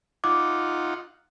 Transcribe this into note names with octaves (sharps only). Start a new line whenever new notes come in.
D#4 F4 F#5 D6